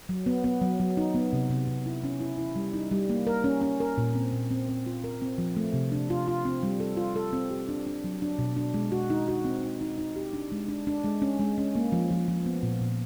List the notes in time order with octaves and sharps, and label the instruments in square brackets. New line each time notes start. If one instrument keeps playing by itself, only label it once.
[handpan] F#3
B3
B3
F#3
F#3
D#4
B3
C3
C3
C3
E4
C#4
E4
E4
G3
D#4
G3
A#3
A#4
C#4
C#4
A#4
A#2
C4
A#2
C4
C4
F4
A#4
C4
F3
A3
C3
D4
F4
F4
C4
G3
A4
F4
A4
C4
G4
D4
D4
F#3
D4
B2
D4
G#3
F#4
D#4
F#4
C4
D#4
D#4
D#4
G4
D4
G#3
D4
D4
G#3
C#4
G#3
C#4
A#3
F3
F3
F3
B3
A#2
A#2